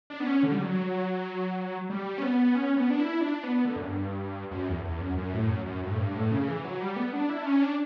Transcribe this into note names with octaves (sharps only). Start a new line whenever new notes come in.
D4
B3
C#4
D3
G3
F#3
G3
C#4
B3
C#4
B3
D4
E4
D4
B3
D3
F#2
G2
F#2
E2
E2
F#2
F#2
A2
F#2
F#2
G2
A2
G2
A2
C#3
E3
F#3
G3
B3
D4
E4
D4
C#4
D4